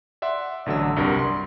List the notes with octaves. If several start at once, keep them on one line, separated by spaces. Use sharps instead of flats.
D5 E5 F#5 C6
A1 D3 F#3 E6
C2 G2 G3 A#4
C6